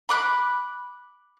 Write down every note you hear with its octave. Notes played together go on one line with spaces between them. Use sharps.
B5 D6 F#6